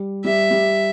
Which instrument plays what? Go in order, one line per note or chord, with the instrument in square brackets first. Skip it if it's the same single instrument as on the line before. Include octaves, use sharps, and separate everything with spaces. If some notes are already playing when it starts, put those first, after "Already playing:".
Already playing: [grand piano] G3
[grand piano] G3 [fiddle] E5
[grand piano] G3